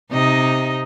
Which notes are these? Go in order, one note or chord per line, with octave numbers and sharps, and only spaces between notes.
C3 D#4 D#5